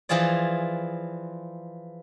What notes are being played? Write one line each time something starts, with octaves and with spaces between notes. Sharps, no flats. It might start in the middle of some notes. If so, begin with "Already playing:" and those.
E3 F3 F4 G#4 D5